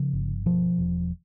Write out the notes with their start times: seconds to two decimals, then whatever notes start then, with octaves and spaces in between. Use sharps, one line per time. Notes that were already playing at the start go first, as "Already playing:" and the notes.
Already playing: C#3 F3
0.13 G1
0.46 B2 F3
0.78 E1